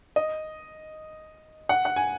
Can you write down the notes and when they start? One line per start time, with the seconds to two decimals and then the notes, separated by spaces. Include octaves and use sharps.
0.16 D#5
1.69 F#5
1.85 F#5
1.96 G#5